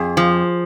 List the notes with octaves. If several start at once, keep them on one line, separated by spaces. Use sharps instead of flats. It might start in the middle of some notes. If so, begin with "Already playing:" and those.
Already playing: F2 G#4
F3